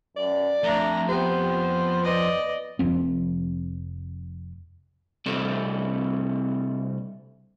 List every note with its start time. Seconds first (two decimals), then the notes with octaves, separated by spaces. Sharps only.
0.17 F#2 D5
0.63 F2 A3 D4 A#5
1.09 B3 G4 C5
2.03 B4 D5 D#5
2.79 F1 F2 C4
5.26 C3 G3 A3 C4 D4